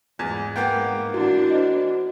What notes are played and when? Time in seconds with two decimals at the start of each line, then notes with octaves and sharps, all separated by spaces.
0.19 E2 G#2 F4
0.56 A#3 B3 G5
1.14 E3 D4 E4 F#4
1.50 C5 D#5